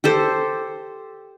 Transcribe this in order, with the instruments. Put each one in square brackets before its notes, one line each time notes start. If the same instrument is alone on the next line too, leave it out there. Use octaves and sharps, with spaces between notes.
[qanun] G4 A4 C5